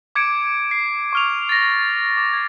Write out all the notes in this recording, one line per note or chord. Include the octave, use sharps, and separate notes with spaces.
D6 G#6 C#7 D7
C7
C#6 F6 F7
A6 A#6
D6
G#6 C7